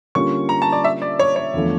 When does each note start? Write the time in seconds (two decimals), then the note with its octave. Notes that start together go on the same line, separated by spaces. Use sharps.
0.15 D3 G3 A#3 C#4 F4 C#6
0.49 A#5
0.62 A5
0.72 D5
0.84 E5
1.02 D5
1.19 C#5
1.36 C#5
1.54 E2 D3 F3 A3